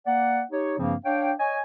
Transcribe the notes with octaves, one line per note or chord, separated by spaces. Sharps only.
A#3 D5 F#5
D#4 G4 C#5
G2 C#3 F3 A#3 C4
D4 C#5 F5 G5
C#5 D#5 G#5